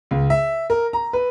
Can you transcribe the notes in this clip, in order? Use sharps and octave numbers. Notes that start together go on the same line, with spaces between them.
C#2
E5
A#4
A#5
B4